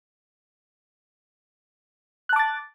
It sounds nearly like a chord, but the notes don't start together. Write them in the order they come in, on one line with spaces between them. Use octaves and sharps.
F#6 A5 D6 A6